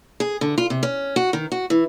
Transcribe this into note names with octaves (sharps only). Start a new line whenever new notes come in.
G#4
D3
F4
C3
C#4
F#4
D#3
F#4
E3